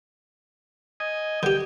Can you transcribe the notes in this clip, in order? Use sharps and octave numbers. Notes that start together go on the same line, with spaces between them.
D#5 G#5
D3 G4 G5